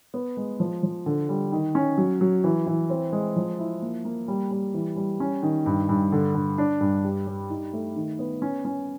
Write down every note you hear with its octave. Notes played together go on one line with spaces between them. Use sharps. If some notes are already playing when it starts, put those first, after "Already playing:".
B3
G#3
F3
F3
D3
G3
D#3
C#4
F#3
F#3
E3
E3
C4
G#3
F3
E4
A#3
A#3
G3
G3
E3
G3
C#4
D#3
G2
G2
D3
D3
D4
G2
G4
G3
D#4
A3
D#3
B3
C#4
C#4